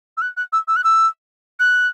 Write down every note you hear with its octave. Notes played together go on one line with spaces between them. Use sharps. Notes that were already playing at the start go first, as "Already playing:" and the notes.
E6
F#6
F#6
E6
E6
F#6
E6
F#6